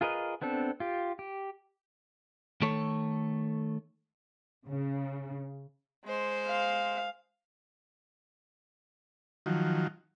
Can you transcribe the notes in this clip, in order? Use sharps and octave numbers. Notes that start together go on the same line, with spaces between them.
F4 G#4 A#4 B4 D#5
B3 C4 D4 A4
F4 G4
G4
D#3 A3 A4 C#5
C#3
G#3 C5
F5
D#3 F3 F#3